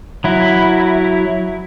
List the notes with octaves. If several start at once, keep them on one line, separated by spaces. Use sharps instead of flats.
F#3 E4